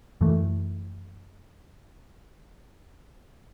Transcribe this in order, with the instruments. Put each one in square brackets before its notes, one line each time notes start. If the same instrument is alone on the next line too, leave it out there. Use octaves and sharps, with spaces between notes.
[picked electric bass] F#2 E3 A3